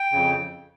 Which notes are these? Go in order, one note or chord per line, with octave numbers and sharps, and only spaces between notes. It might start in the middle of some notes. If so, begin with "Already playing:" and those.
Already playing: G5
F2 C#3